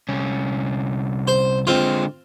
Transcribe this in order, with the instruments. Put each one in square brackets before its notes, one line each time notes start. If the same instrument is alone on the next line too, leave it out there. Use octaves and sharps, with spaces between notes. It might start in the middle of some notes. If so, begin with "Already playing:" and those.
[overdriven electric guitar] C2 C#4
[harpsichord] C5
[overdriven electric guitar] D3 G#3 [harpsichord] C4 F4